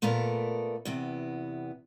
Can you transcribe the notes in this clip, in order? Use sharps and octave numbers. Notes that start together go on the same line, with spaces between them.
A#2 A3 B3 A4 A#4 D5
E2 C3 B3